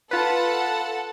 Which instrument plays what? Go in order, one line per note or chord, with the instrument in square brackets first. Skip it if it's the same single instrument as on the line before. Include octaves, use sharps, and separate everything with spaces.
[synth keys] F4 B4 [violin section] A4 F#5 A5